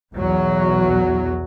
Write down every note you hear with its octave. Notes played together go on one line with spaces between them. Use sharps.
B1 E2 F#3